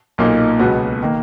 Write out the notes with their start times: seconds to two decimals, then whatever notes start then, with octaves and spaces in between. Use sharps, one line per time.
0.18 B1 A#2 A#3 D#4
0.59 C#2 B2 F#3 B3
1.02 D#3 A#3